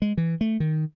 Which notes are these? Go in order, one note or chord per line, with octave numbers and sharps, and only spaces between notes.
G#3
E3
A3
D#3